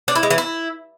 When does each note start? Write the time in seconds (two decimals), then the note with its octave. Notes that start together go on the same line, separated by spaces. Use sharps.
0.08 D4
0.15 E4
0.23 G#3
0.30 E3
0.38 E4